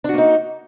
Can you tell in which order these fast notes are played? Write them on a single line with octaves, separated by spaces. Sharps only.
D4 F#4 A#3 D#4